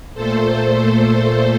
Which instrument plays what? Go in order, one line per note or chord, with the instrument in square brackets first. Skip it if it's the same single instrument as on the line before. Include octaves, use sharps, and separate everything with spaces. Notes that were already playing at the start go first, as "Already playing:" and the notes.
[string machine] A#2 A3 A4 C5